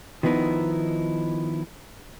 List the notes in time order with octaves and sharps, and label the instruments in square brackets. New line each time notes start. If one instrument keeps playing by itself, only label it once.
[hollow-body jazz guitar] D#3 F3 B3 D#4 E4